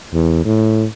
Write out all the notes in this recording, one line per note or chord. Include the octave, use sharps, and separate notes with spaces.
E2
A2